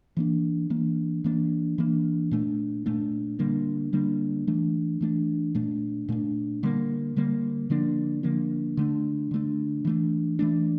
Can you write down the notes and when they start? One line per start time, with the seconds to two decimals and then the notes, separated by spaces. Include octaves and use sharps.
0.17 E3 A#3 D4
0.70 E3 A#3 D4
1.24 E3 A#3 D4
1.78 E3 A#3 D4
2.31 A#2 A3 D4
2.86 A#2 A3 D4
3.39 D3 G3 A#3 D4
3.93 D3 G3 A#3 D4
4.47 E3 A3 D4
5.01 E3 A3 D4
5.55 A#2 A3 D4
6.09 A#2 A3 D4
6.63 D3 G3 A#3
7.16 D3 G3 A#3
7.70 D3 F3 A#3 D4
8.23 D3 F3 A#3 D4
8.77 D3 A3 D4
9.31 D3 A3 D4
9.85 E3 A3 D4
10.39 E3 A3 D4